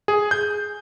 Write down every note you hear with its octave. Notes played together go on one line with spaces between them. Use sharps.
G#4
G6